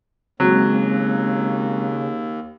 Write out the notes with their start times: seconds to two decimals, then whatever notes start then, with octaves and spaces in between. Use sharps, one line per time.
0.40 D#2 C#3 F#3 G#3 C4